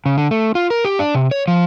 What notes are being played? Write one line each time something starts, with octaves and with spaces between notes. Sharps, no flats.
C#3
D3
A3
F4
A#4
G4
D4
C3
C#5
F3